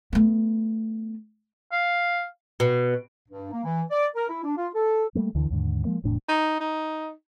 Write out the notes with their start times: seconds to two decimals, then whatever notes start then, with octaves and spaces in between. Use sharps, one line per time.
0.13 A3 B3
1.72 F5
2.60 B2
3.29 G2
3.51 A#3
3.64 E3
3.91 D5
4.16 A#4
4.29 E4
4.44 D4
4.57 F4
4.74 A4
5.15 G3 A3 A#3
5.35 D2 D3 E3
5.50 D#2 G#2 D3
5.85 F3 G#3 A#3
6.04 F1 E2 A2 D4
6.29 D#4
6.60 D#4